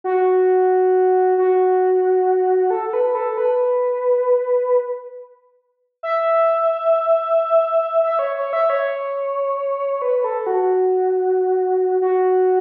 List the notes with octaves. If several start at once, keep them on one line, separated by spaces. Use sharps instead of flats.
F#4
F#4
A4
A4
B4
A4
B4
E5
E5
C#5
C#5
E5
C#5
B4
A4
F#4
F#4